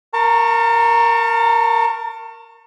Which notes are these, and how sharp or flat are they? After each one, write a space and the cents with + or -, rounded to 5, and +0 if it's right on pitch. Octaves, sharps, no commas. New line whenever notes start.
A#4 +0 A5 +35 C#6 -15